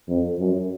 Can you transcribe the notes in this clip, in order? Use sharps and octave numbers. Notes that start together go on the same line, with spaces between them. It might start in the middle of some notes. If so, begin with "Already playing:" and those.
F2
F#2